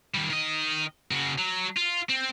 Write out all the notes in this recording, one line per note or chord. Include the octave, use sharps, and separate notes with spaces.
D#3 G3
D#3 D#5
C#3 F#4
F#3
F4
C4